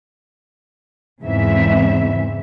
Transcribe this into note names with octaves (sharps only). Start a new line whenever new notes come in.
E2 G#2 C#3 E3 C4 E5